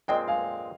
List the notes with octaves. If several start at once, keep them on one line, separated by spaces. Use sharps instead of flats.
A#2 G#3 C4 D#5 G5
F5 G#5